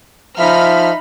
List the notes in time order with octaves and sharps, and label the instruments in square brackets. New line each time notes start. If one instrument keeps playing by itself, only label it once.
[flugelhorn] F3 [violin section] D#4 B5 F6 [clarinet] E5